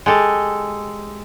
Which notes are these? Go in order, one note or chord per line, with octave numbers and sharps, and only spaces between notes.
G#3 G4 A4